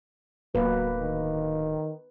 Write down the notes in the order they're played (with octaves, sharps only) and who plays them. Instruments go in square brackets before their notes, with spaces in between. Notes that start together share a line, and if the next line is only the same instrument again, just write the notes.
[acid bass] D1 [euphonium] F#3 [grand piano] A#3 [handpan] B4
[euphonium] D#3